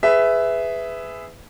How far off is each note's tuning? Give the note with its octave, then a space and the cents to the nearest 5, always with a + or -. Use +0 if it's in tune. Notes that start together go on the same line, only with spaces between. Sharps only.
G#4 +0 B4 +15 E5 +0